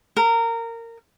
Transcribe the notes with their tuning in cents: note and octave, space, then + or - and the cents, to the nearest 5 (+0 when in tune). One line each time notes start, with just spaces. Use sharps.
A#4 -20